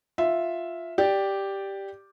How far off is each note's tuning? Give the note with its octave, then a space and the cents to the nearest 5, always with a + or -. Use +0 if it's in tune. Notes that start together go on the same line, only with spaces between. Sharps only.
F4 +5 E5 +0
G4 +0 D5 +0